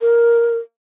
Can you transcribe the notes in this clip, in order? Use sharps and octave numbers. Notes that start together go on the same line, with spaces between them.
A#4